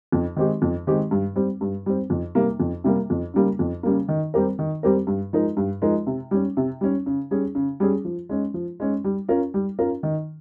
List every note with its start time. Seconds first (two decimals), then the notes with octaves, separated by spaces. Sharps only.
0.12 F2
0.36 D#3 G#3 C4 G4
0.62 F2
0.87 D#3 G#3 C4 G4
1.11 G2
1.36 G3 C4
1.61 G2
1.86 G3 C4
2.10 F2
2.35 C3 G3 A#3
2.60 F2
2.84 C3 G3 A#3
3.10 F2
3.34 C#3 G3 A#3
3.59 F2
3.83 C#3 G3 A#3
4.08 D#3
4.34 G3 C4 G4 A#4
4.59 D#3
4.83 G3 C4 G4 A#4
5.07 G2
5.33 F3 G#3 D#4 A#4
5.57 G2
5.82 F3 G#3 D#4 A#4
6.07 C3
6.31 G3 C#4
6.57 C3
6.81 G3 C#4
7.06 C#3
7.31 G3 C#4 G#4
7.55 C#3
7.80 G3 C#4 G#4
8.05 F3
8.29 G#3 C#4
8.54 F3
8.80 G#3 C#4
9.04 G3
9.29 C#4 F4 A#4
9.54 G3
9.79 C#4 F4 A#4
10.03 D#3